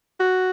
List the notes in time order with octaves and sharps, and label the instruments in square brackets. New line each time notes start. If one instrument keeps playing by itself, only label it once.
[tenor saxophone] F#4